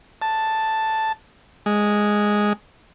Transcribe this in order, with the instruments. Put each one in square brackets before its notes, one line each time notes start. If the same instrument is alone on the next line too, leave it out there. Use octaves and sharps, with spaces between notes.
[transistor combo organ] A5
G#3